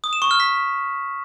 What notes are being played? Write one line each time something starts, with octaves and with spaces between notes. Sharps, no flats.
D#6
E7
C#6
F6
B6